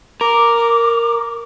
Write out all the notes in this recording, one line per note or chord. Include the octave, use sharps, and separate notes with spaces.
A#4 D6